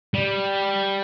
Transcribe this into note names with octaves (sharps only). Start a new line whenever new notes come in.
G3